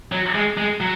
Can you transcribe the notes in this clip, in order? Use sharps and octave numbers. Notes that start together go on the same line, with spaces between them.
F#3
G#3
G#3
F#3